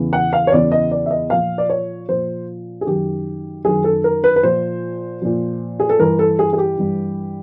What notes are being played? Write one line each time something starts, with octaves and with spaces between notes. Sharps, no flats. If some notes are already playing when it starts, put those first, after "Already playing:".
Already playing: E2 C#3 E3
F#5
F5
C#5
E2 C#3 E3 D5
D#5
D5
E5
D#5
A#2 F3 F5
D5
C#5
A#2 F3 C5
G#4
F#2 D#3 G4
F#2 D#3 G#4
A4
A#4
B4
B4
A#2 F3 C5
A#2 F3
G#4
A4
G2 E3 A#4
A4
G#4
G#4
G4
G2 E3